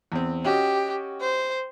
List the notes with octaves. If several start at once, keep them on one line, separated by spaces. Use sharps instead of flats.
E2 C4
C#4 F#4 G4 D#5
C5